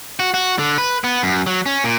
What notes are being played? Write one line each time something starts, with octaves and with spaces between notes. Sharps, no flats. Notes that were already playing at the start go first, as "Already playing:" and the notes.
F#4
F#4
D3
B4
B3
F#2
F#3
C#4
A#2